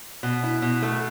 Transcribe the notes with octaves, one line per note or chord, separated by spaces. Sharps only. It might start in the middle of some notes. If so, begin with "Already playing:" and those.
B2
E4
B2
A3